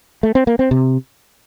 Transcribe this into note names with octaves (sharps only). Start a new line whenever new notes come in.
A3
C4
A#3
C4
C3